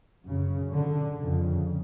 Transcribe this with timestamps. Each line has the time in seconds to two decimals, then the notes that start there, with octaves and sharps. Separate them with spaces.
0.24 F#2 C#3
0.72 D3
1.20 F2 C#3